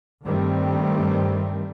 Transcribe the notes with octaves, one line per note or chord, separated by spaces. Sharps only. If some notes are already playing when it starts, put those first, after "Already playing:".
G2 D#3 G3 A3 C4